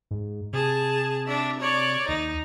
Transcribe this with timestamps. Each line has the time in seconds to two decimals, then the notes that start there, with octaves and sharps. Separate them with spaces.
0.11 G#2
0.53 C3 G#4 A5
1.27 D4 E5
1.60 C#5 D5
2.08 D#2 D#4